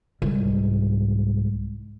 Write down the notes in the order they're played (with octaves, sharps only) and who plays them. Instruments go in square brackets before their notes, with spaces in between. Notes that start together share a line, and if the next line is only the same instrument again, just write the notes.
[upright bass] C2 G#2